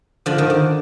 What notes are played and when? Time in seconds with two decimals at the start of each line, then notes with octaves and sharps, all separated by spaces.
0.26 D3 F3
0.38 D#3
0.50 D3